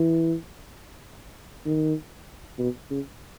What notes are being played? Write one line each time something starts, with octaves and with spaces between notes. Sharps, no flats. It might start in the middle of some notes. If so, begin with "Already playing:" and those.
Already playing: E3
D#3
B2
C#3